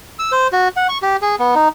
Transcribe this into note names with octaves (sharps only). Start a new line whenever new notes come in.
E6
C5
F#4
F#5
C#6
G4
G#4
B3
D#4